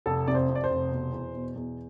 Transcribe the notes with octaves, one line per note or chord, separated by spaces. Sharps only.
F1 A4
C3 D5
C5
F2
D5
C5
F1
B2
E2
B2
E2